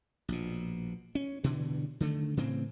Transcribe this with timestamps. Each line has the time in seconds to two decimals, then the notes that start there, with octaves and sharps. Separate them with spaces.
0.28 A#1 B2
1.15 C#4
1.43 G2 B2 D3 E3
2.00 D3 D#3 A3
2.37 A2 C#3 E3 C4